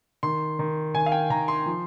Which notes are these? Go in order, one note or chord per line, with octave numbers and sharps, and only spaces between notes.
D#3 C6
D#3
D#3 G#5
F5
G5
D#3 A#5
C6
F3